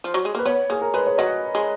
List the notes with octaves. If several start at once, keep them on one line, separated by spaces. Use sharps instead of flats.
F3
F#3
G#3
A#3 B4
B3 C#5
A#3 G#4
A#4
G#3 B4
C#5
F#3 D#5
G#3